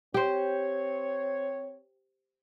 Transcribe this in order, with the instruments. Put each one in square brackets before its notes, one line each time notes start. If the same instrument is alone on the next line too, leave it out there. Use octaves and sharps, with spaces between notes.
[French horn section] C4 C#5 [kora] G4 C5